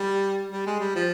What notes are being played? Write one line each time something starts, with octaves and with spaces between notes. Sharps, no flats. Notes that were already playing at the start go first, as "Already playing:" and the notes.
Already playing: G3
G3
G#3
G3
F3